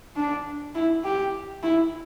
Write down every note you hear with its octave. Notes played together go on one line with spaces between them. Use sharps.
D4
E4
G4
E4